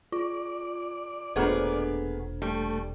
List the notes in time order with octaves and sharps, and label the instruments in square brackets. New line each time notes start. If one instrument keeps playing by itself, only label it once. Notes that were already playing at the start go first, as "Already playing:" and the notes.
[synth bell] F4 [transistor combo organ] D5
[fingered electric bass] E1 A#2 [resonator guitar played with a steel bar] A3 B3 G#4 [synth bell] D4 A4 C5
[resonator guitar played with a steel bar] G3 [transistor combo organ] A3